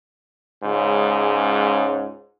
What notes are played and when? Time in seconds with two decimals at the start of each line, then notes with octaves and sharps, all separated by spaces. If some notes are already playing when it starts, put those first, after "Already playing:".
0.63 C#2 G#2 C#3